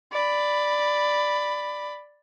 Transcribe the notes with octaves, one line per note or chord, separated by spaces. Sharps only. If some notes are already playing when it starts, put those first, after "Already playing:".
D5 B5